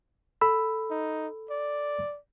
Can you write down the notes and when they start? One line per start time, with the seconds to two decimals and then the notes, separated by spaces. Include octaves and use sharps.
0.41 A4 B5 E6
0.91 D#4
1.50 D5